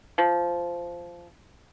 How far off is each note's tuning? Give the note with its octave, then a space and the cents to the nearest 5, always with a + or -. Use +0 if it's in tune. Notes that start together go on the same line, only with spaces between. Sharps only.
F3 -10